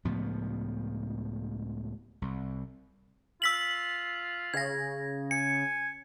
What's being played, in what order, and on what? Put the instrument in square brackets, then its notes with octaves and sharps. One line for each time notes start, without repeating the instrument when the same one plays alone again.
[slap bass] C#2 A2 F3 B3
C2
[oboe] F4 [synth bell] E6 B6 F#7
[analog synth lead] C#3 [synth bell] G#6 A#6
[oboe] G#5 [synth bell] C#7